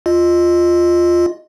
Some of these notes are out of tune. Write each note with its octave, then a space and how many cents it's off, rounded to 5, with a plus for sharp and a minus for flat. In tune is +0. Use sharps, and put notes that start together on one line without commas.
F4 +0 D#5 -10